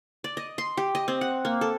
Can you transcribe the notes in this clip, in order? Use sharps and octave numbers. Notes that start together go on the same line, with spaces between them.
D5
D#5
C6
G4
D#5
C4
F#5
A#3
A4